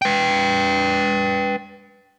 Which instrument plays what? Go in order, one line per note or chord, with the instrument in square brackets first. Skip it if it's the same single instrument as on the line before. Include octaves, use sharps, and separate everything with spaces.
[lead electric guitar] B4 G5